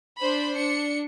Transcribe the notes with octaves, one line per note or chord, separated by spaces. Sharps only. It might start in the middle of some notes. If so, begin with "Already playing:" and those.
D4 C5 B5
D4 C#7